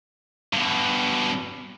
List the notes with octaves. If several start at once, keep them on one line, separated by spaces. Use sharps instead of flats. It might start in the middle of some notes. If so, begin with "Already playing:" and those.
G2 B2